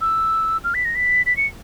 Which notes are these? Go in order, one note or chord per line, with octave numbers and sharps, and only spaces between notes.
E6
F6
B6
A#6
B6
B6
C#7